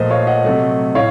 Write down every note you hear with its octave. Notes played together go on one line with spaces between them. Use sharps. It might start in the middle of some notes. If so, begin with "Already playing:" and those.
Already playing: A#2 F3 A3 C5 D#5
C#5 F5
D#5 F#5
C3 F#3 A3
A2 C#5 F5